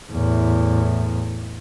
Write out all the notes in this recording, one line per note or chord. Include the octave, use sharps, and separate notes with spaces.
E2 A2